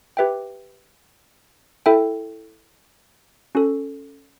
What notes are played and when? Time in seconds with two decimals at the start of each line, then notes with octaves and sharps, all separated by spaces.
0.17 G4 B4 E5 G5
1.86 E4 A4 E5 G5
3.55 C#4 F#4 A4